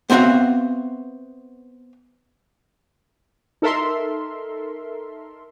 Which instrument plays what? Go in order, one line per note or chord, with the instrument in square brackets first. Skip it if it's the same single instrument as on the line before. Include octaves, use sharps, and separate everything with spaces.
[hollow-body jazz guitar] B3 C4 F#4 E5 F5
[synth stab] D#4 A4 A#4 E5 C6